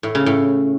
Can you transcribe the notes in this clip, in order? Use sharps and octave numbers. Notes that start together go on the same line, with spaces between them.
A2
C#3
A2